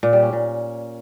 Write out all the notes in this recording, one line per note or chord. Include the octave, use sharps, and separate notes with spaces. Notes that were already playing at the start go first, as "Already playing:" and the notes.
A#2
G3
C#4
A#2